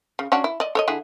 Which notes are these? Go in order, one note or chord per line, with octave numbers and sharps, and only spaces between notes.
C#3
C#4 D4 F#4
E4
D5 D#5
A4 C#5 D#5
D3 E4 G#4